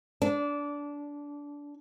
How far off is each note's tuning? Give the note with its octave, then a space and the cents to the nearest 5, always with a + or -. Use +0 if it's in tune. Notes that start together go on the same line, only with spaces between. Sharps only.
D4 -20